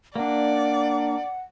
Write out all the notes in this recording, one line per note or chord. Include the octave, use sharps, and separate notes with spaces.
A#3 D4 D5 F#5